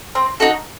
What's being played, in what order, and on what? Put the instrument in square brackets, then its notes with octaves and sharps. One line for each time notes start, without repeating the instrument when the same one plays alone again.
[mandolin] C4
D#4 F#4 A4